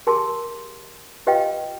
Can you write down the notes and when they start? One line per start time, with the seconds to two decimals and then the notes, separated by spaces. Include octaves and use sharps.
0.07 G4 G#4 A#4 A5 C6
1.27 F4 G4 B4 D#5 F5 G5